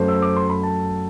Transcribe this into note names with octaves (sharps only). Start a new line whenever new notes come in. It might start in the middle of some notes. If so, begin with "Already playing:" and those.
Already playing: F#2 F#3 A3 C5
E6
D6
C6
B5
A5